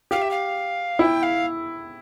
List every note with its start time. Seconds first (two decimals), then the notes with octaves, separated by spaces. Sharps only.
0.11 G4 F5
0.21 E5
0.30 F5
0.99 E4 G5
1.22 F5